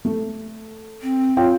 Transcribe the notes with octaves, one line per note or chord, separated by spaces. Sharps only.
A3
C4
F4 C#5 G5